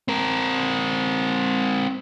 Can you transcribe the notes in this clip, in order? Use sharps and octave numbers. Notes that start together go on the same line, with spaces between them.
C4 A#4